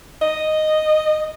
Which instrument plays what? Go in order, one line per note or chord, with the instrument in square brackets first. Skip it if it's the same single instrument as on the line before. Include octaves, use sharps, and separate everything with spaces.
[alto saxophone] D#5